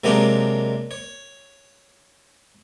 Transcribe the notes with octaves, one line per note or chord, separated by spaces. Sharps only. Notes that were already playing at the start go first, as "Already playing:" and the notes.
C3 F#3 G#3 A#3 D4 D#4
C#5